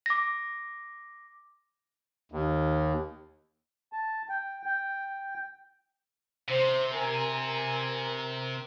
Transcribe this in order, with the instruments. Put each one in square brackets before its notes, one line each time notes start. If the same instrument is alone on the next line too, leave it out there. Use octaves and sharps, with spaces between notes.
[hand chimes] D6 A#6
[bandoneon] D#2
[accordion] A5
G5
G5
[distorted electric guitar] C3 [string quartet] C5
[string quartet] A#4 [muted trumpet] G#5
[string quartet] A#4